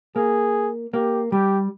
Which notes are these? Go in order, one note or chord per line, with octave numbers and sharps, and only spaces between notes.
A#3 G#4
A#3 G4
G3 G4